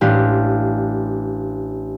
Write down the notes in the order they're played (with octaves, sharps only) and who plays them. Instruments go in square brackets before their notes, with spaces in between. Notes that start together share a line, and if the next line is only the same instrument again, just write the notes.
[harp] A1 D4 G4 F5